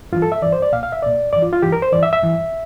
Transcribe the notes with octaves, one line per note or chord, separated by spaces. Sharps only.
G2 E3 F4
A4
E5
G2 E3 D5
C5
D5
C2 A#2 F5
F5
E5
C2 A#2 D5
G2 E3 D5
F4
F4
G2 E3 G4
A#4
C5
G2 E3 D5
E5
E5
G2 E3